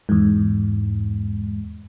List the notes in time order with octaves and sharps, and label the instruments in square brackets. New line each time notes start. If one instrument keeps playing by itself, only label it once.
[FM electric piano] E2 G#2